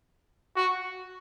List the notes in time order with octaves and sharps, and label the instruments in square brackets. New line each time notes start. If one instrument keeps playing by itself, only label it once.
[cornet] F#4